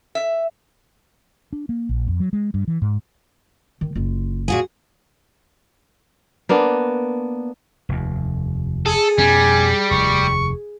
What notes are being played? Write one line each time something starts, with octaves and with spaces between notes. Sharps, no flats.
E5
D4
A#3
A#1
F2
F#3
G#3
G2
E3
G#2
D#3
F#1 F4
A#2 F4 F#4 G#4
A#3 B3 D4
F1 D#2
G#4 A4
F2 B2 G3 C#4 G#5
F1 D#2 C#6